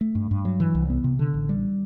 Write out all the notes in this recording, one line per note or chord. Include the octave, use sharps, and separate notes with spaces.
A3
G2
G2
F#3
E3
C2
B3
C3
D3
A1
G3